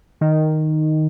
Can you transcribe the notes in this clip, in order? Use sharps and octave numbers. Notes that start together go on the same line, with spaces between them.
D#3